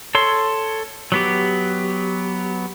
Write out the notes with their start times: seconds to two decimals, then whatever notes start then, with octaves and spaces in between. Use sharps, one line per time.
0.15 A4 C#5 C6
1.12 F#3 B3 G4